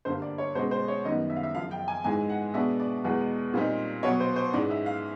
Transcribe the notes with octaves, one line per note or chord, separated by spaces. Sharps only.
G2 D3 G3 A#3 C5
D5
C#5
B2 G#3 C#4 C5
C5
C#5
F#2 D#3 G3 B3 D#4 D#5
E5
F5
E5
F#2 C#3 F3 F5
G5
G#5
G#2 E3 G#3 G#5
F#5
B2 G#3 B3 D4 E5
D5
E2 B2 G#3 B3
A#2 G3 C4 D#4
B2 F#3 B3 C#5
C5
C5
G#2 E3 G#3 C#4 D5
E5
F5